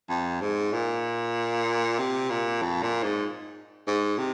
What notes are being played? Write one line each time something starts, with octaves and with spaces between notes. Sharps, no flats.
F2
G#2
A#2
C3
A#2
F2
A#2
G#2
G#2
C3